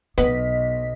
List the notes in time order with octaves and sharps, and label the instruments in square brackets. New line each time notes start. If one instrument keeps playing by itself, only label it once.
[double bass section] B1 [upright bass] B3 [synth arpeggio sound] B4 F#5 [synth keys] D#5 B6